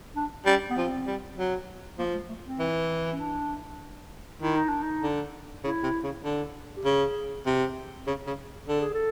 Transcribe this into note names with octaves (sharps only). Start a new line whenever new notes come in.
D4
G3 C#4
B3
F3 C4
G3
F#3
F3 A#3
G#3
A3
C4
E3
C#4
D4
D#3 E4
D#4
D4
D#4
D3
C#3 E4
C3
C#3
D3
G4
C#3 G#4
C3
C#3
C#3
D3 A4
G#4
A4